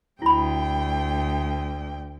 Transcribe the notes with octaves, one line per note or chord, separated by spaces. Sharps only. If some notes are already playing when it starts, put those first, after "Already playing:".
D2 E4 G5 B5